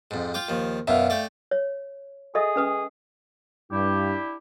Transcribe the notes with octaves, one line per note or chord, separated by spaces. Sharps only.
F2 G#2
F4 G5 D6
D#2 F3
F#2 B2 D4 E5 F5
A3 D5 G5
C#5
G#4 A4 D#5 E5
C#4 B4 D#6
G2 D4 E4 G4